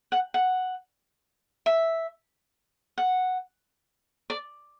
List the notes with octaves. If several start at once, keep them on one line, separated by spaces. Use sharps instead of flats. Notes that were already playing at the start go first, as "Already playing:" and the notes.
F#5
F#5
E5
F#5
D5